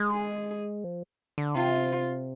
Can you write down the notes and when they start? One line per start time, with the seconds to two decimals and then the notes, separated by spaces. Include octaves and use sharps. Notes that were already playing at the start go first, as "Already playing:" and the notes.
Already playing: G#3
0.12 G#4
0.84 F3
1.38 D3
1.55 C3 F4